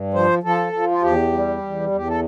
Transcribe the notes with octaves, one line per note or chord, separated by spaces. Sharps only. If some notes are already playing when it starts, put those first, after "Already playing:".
Already playing: G2
F3 C5
F3 A4
F3
F4
E2 G4
G3
E2
E2 G4
A4